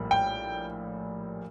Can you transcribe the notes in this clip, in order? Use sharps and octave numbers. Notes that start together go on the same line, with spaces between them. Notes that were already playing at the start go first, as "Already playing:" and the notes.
Already playing: A#1 A2 G3 A#3
G5